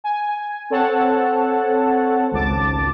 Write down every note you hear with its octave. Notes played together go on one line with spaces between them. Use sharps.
G#5
C4 A4 C#5 F#5 A5
G#1 C#2 A5 D6 A6